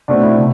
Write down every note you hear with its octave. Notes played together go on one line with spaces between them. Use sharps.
B2 A3 C4 D4
E4
C3